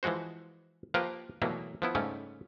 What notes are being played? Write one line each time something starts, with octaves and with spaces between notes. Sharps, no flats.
E3 F3 G#3 F#4 C5
F3 A#3 G4 A#4 B4
B2 E3 F#3 G3 A3 A#3
F3 B3 E4
G#2 C#3 G3 A3 C#4